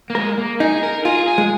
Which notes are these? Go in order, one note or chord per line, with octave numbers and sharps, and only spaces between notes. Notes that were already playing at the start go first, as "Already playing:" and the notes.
A#3
G#3 A#4
A#3
D#4 G#4
A#4
F4 G#4
G#4
G#3